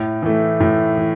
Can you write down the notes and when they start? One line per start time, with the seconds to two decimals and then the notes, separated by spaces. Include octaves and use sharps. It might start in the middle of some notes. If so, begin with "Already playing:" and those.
Already playing: A2
0.22 E3 A3
0.60 A2
0.97 E3